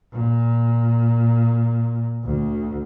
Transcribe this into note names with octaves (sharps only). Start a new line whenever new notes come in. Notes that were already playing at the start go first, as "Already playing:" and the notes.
A#2
D2